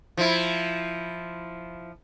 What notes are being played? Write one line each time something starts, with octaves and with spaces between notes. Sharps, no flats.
F3 E4